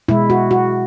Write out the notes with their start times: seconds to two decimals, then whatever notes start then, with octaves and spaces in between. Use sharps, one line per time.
0.08 B2 G#3 E4
0.30 F#4
0.51 F#4